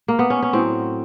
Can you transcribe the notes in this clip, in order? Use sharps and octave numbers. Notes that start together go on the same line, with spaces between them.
A#3
B3
C#4
C#4
A2 F#3 C4